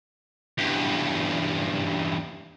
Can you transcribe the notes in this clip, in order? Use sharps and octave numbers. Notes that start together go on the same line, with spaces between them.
E2 G2